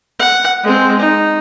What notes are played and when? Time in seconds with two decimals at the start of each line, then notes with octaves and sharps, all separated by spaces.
0.19 F#5
0.64 G#3 C4
0.99 D#4